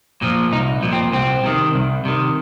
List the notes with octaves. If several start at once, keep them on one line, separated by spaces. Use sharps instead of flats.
A#2 F3
C2 D#4
A#2 F3
C4
C2 C4
C3 D#3
C2
C3 D#3